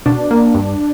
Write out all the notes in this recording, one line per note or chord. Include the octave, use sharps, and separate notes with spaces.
B2 D4
A#3
G2